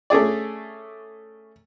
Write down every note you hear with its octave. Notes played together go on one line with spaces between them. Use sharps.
A3 C#4 G#4 D5